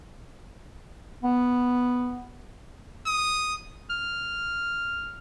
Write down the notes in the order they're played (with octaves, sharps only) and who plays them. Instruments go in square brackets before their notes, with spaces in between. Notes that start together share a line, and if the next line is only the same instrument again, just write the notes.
[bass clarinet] B3
[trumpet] D#6
[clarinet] F6